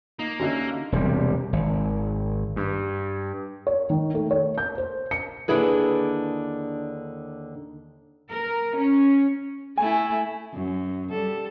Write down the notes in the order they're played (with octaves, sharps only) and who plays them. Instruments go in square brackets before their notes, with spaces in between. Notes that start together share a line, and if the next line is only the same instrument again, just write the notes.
[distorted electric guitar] A#3 [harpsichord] D#4
[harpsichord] D#2 [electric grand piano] D3 C#4 [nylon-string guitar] F#4 D#5 E5
[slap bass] E1 C3 G3
G#1
G2
[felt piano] C#5
D#3
A3
C#5
G6
C5
C#7
[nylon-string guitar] D#2 D3 D4 E4 G#4 B4
[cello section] A#4
C#4
[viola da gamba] A3 E4 [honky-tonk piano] G#5
[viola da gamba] F#2
G3 A4